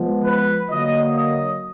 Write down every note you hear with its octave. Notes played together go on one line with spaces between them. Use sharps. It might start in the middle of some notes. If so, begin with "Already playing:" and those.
Already playing: F3 G#3 B3
B4
D3 F#3 A#3 D#5
D#5